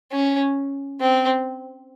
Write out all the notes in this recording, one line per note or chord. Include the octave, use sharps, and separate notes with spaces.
C#4
C4